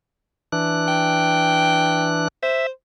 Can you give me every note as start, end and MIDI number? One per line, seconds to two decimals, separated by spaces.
0.52 2.28 52
0.52 2.28 62
0.52 2.28 90
0.88 2.06 79
2.43 2.69 72
2.43 2.66 76